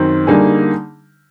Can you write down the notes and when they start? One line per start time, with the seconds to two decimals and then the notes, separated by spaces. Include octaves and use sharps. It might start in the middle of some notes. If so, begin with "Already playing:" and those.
Already playing: F#2 D#3 C4
0.27 D3 G3 A#3 D#4 G#4